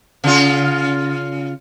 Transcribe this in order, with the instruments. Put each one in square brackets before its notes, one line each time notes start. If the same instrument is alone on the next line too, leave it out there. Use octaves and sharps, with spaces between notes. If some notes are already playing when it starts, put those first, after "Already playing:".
[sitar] C#3 F4